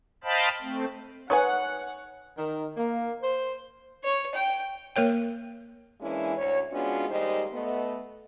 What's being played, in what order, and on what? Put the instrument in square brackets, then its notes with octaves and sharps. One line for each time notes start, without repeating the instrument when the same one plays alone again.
[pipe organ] C5 D#5 F5 G5 A5 B5
A3 C4
[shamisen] D#4 B4 G#5 [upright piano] C#5 [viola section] F#5
[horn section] D#3
A#3
C5
[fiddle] C#5
G5
[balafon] A#3 A#4 C#5 G5
[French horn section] E3 G#3 A#3 C#4 D4 E4
D2 C#5
G#3 B3 C#4 D4 F4 F#4
D#2 G3 G#3 D#4 C5 D#5
A3 B3 D#5